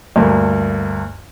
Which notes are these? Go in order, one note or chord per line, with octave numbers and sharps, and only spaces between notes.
D2 G2 A#3